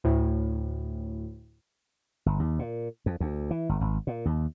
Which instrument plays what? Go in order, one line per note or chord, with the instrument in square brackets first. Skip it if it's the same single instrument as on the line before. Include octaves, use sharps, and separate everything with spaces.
[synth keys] D2 A2
[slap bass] G1
D#2
A#2
F2
D2
E3
G1
G#1
A#2
D#2